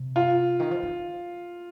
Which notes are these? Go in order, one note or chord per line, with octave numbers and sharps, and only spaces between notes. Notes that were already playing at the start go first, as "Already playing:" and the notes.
Already playing: C3
F4
D#3
F3
D#3